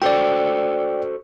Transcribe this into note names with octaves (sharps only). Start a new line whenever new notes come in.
F#4 A4 C5 D5 G5